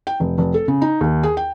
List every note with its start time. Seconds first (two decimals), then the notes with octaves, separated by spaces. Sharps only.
0.07 G5
0.20 F1
0.38 F1
0.54 A4
0.68 C#3
0.82 D#4
1.01 D#2
1.23 G#4
1.37 G5